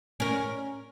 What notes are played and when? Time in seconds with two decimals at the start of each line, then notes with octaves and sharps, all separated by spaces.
0.20 C#4 A#4